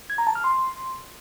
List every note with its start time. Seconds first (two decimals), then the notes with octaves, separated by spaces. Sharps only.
0.10 G#6
0.18 A#5
0.27 A5
0.35 F6
0.44 C6